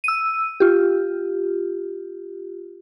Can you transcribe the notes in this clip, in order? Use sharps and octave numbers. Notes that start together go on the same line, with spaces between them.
E6 D#7
F4 G4